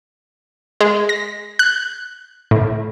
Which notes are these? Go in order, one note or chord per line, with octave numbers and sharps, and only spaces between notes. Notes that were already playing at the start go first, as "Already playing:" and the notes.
G#3
A#6
F#6
A2